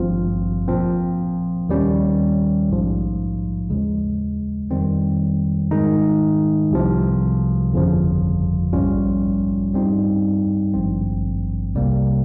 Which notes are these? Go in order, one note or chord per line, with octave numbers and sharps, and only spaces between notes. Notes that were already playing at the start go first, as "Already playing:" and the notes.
Already playing: G#1 G2 F3 C4 F4
A#2 F3 C4
D#2 D#3 G3 C#4
A#1 G#2 F3
D#2 C#3 G#3
F2 D#3 G3 C4
G#2 D#3 G#3 D#4
C2 C3 F3
G1 F2 C#3 F3
A#1 G#2 G3 C#4 F4
G2 G3 C4 D#4
G#1 G2 F3 C4
C2 C3 G3 A#3